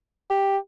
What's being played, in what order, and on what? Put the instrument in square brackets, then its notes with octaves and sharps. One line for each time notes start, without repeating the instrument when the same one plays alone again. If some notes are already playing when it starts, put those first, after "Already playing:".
[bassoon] G4